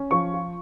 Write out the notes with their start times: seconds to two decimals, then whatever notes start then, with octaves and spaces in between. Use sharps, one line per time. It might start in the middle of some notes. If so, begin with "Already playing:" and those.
Already playing: C#4
0.11 F3 C#6
0.34 F4